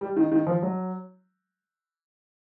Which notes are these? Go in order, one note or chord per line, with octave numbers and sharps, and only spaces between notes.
G3
D#3
D#3
F3
F#3